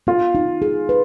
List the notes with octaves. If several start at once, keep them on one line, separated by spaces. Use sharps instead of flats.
B3 F4
D#4
G#4
B4